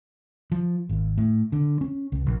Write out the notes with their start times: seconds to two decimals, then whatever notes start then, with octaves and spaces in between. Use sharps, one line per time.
0.52 F3
0.89 G#1
1.18 A2
1.52 D3
1.81 C#4
2.12 C#2
2.26 A#1